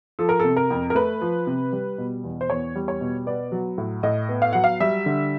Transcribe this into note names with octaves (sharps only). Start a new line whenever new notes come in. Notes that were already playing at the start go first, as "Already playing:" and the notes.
F3 A4
A#4
C3 A4
A#4
F2
A#4
A3 B4
F3
C3
G3
B2
E2
C5
E2 C#5
G3
C#5
B2
B3 D5
F#3
A2
A2 D#5
B3
F5
F#3 F#5
F5
G3 E5
D3